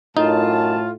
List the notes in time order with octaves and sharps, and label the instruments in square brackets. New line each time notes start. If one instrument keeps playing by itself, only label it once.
[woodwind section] F#2 A5 [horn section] A2 F4 [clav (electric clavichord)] D#4